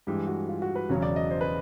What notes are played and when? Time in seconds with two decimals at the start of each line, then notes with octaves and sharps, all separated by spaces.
0.07 G2 E3 G#3 G4
0.27 F#4
0.49 F4
0.62 F#4
0.75 B4
0.89 E1 E2 C#3 F#3 C#5
1.02 D5
1.16 D#5
1.31 C5
1.41 B4